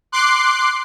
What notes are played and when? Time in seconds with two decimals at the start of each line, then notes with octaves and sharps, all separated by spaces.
0.12 C6 D6 F#6 C7